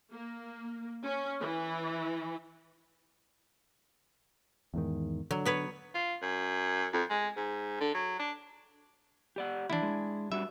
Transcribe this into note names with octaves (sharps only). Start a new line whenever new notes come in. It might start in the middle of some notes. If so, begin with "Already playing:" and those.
A#3
C#4
E3
E2 G#2 D#3
D3 F#3
B3 B4 C#5
F4
F#2
F2
G#3
G#2
D3
F#3
D4
G4 D5 F#5
D2 E3 D4 E4
G#3
G3 D4 F#4 E5